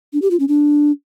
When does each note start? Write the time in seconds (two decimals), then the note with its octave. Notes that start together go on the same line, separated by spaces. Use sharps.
0.13 D4
0.22 G4
0.31 F4
0.40 C#4
0.48 D4